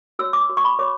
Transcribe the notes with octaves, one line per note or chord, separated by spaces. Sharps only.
F#4 C#5 E6
D6
F#4 C#5
C#6
B5
F#4 C#5 D6